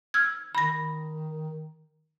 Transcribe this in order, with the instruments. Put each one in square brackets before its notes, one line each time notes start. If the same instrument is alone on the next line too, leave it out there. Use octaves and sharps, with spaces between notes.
[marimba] E6 F6 G#6
[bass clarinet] D#3 [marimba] B5 A#6